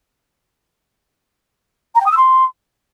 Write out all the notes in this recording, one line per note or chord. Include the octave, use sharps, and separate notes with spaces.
A#5
G5
D#6
E6
C6